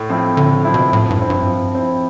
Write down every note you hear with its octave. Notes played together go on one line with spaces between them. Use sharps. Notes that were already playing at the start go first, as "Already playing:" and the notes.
Already playing: A2
F3 C4 E4
A2 D3
F3 C4 E4
B2
A2 F3
G2
C4 E4
G2
F3
C4 E4